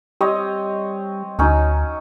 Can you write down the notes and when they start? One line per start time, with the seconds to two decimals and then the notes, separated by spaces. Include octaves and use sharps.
0.21 G3 C4 C#5 D#5
1.39 D2 F#3 C#4 D#4